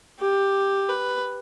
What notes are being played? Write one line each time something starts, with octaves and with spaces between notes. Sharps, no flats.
G4
B4